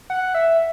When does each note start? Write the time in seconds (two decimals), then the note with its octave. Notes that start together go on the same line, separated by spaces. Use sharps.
0.10 F#5
0.34 E5